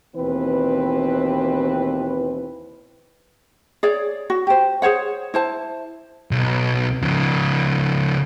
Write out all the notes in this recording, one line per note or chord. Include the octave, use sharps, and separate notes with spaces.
D#2 B2 E3 C4 B4
G#4 C#5 D5
F#4
G4 C5
G#4 C5 C#5 F#5
E4 C5 A5
B1
C#3 F3